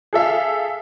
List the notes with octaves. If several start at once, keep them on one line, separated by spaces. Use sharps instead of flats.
G#4 A4 E5 F5